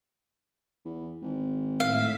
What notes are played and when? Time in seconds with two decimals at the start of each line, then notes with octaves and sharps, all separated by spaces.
0.85 E2
1.22 G#1
1.80 A2 E5 F5 B6